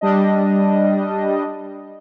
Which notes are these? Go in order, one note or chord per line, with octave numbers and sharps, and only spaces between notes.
G3 D4 D#5